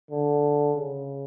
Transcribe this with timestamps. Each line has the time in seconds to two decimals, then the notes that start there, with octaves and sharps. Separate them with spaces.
0.11 D3
0.76 C#3